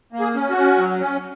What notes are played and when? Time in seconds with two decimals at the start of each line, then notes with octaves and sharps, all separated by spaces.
0.13 A#3
0.20 G#4
0.35 C#4
0.50 F#4
0.57 C#4
0.78 F#3
1.01 C#4